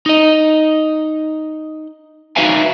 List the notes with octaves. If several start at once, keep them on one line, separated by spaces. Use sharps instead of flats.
D#4 D#5
D#4 F#4 B4 E5 F5 G#5